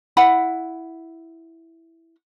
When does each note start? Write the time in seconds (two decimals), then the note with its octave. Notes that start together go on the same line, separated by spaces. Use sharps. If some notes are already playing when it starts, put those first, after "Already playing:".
0.17 E4 F#5 B5